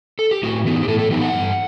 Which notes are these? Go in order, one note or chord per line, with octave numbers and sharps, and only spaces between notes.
A4
G4
A2 F#4
E3 B3 D#4
G4
A2 A4
A4
E3 B3 D#4 G4
F#5
G2